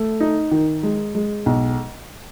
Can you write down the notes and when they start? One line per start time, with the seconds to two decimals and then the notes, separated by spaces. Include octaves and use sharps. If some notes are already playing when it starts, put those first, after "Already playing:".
Already playing: A3
0.20 D#4
0.51 D#3
0.83 G#3
1.15 G#3
1.46 B1